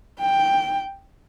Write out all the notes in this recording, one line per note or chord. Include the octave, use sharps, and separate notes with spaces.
G5